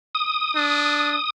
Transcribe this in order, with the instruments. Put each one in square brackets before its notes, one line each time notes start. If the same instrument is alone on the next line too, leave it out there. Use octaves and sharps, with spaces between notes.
[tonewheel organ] D#6
[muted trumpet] D4